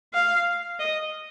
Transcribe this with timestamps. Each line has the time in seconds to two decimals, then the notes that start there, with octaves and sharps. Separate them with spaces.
0.14 F5
0.80 D#5